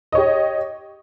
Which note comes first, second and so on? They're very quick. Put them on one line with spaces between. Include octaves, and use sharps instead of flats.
D#5 C#5 G4